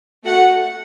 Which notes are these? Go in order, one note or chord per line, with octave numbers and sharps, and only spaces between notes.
A3 F#4 A4 F#5